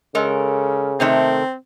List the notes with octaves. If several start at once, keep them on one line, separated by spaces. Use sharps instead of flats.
C#3 G#3 A4 A#4
C3 D#3 A3 C4